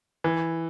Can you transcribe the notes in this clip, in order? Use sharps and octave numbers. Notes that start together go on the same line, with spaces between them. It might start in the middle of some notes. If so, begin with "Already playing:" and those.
E3